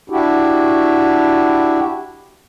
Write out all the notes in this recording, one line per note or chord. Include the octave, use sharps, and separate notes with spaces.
D4 E4 F#4 G4